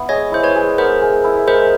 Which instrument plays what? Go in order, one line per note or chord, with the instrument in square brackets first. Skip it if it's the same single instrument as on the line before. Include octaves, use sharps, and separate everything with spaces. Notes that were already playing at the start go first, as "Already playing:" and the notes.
Already playing: [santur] B3 E4
[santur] G#3 [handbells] C#5 D#5
[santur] E4 [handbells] C5
[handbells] B4 C#5
[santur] G#3
[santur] B3 [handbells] A#4 C5
[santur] G#3
E4
[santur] G#3 [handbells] A#4 C5